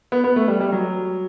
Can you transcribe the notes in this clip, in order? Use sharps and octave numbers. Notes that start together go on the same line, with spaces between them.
B3
B3
A3
G3
G3
F#3